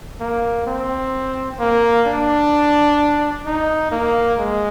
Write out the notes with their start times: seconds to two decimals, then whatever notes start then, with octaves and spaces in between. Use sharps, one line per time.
0.21 A#3
0.67 C4
1.60 A#3
2.07 D4
3.46 D#4
3.92 A#3
4.39 G#3